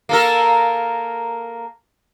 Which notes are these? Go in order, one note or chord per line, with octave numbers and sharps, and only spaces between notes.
A#3 A4 A#4